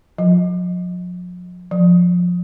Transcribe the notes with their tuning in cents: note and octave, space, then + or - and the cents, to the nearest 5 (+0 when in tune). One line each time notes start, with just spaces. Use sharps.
F3 +40
F3 +20